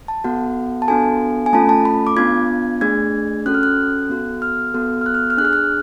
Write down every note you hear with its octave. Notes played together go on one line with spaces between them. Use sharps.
A5
B3 F#4 A4 F#5
A5
B3 D4 F#4 A4 G#5
G#5
A3 C#4 F4 A4 A5
A5
B5
D6
B3 D4 F4 G#6
A3 D4 G#4 G#6
C#4 F#4 A4 F#6
F6
F#6
B3 F#4 A4
F6
B3 F#4 A4
F6
F#6
F6
F6
D4 G#4 F6 F#6
F#6